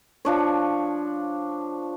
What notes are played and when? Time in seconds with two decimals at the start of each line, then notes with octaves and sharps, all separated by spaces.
0.25 F3 D4 C#5